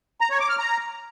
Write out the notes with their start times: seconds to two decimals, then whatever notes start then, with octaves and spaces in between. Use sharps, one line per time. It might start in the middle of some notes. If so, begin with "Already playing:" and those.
0.21 A#5
0.30 C#5
0.40 D6
0.49 F6
0.59 A#5